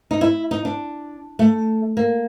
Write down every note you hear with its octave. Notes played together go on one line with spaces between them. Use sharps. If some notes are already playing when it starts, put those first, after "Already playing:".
D#4
E4
D#4
D4
A3
A#3